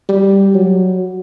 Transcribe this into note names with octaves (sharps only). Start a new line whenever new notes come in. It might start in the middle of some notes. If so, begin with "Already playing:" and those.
G3
F#3